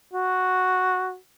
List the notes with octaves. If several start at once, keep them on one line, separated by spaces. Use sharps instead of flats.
F#4